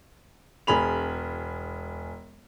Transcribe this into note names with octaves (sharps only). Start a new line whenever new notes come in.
E1 G#4 B5 F7